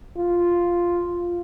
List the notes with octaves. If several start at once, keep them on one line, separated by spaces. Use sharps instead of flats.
F4